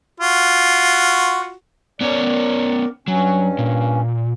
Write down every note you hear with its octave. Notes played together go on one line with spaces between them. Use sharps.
F4 F#4
B3 C#4 A#4 C#5 D5
G2 F#3 C#4
A#2